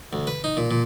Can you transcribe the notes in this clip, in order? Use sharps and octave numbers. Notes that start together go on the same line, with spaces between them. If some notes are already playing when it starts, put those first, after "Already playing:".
D2
B4
D#4
A#2
A#2